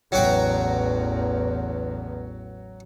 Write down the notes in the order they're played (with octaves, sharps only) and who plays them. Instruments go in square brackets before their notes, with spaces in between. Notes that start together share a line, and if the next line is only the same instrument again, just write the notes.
[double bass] A1 E2 [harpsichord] F#3 F#4 G5